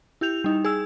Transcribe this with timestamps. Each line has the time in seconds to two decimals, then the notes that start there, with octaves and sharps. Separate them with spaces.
0.21 E4 G4 G6 F7
0.44 G3 D#4
0.65 G#4 E6